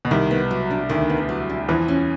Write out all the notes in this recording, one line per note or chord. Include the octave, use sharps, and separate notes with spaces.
B2
C2 C3 D#3
B3
F#3
D4
D2 D3 D#3
B3
F#3
D4
E2 E3 F3
C#4